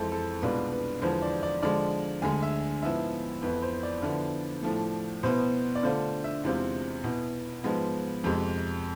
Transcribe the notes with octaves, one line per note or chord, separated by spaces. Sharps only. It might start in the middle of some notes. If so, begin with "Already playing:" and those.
Already playing: F2 E3 G#3 C4 E4 A4
A4
C2 B2 G#3 D4 F4 B4
B4
E2 D3 F3 G#3 B3 C5
D5
D5
D3 F3 G#3 D5
D2 D3 G#3 G#5
E5
G#2 F3 B3 E4 E5
F2 E3 B3 E4 B4
C5
D5
D3 F3 B3 E4
A2 F3 A3
B2 B3 E4 C5
D5
D3 A3 D4 F4 C5
E5
E2 C3 G#3 C4 F4
B2 B3 E4
G#2 F3 G#3 B3
F2 C3 G#3